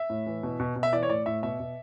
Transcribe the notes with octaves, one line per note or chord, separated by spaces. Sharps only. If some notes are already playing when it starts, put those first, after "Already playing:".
Already playing: E5
A2
E3
B2
B2
B2
E5
E3 D5
C#5
A2 D5
A2 E5
B2 E5
B2